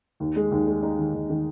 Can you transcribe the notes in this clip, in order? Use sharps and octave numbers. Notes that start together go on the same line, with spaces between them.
D#2
G#3
D#2
G#3
D#4
D#3
D#2
D#3